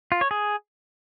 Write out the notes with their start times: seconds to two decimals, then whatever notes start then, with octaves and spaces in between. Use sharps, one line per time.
0.12 F4
0.21 C#5
0.31 G#4